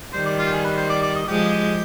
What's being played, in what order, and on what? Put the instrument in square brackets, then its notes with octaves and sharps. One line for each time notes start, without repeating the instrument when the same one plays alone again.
[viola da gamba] D#3 G3 [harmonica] C5
[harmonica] D5
F4
G4
G#4
B4
C5
D5
D5
D#5
[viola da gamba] F3 G#3 [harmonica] G4